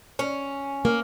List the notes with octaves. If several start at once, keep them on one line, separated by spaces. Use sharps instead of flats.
C#4
A#3